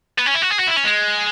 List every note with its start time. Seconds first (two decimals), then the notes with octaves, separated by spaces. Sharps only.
0.18 B3
0.26 C#4
0.34 E4
0.42 F#4
0.50 G#4
0.59 F#4
0.67 E4
0.76 C#4
0.85 G#3